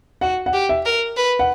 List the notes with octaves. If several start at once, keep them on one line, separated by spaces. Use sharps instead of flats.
F#4 F#5
F#5
G4
E5
A#4
B4
F#5